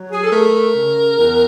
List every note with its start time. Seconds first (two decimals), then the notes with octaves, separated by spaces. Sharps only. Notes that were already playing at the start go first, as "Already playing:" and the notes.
Already playing: F#3
0.12 G#4
0.24 A4
0.32 A3 A#4
0.75 C#3
1.17 E2